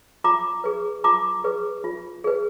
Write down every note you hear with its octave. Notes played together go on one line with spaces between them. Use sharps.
F4 A#5 D6
G#4 B4
F4 A#5 D6
G#4 B4
F4
G#4 B4